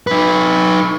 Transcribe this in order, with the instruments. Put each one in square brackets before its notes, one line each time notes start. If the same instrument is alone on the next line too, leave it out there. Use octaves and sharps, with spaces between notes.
[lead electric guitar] D#4 B4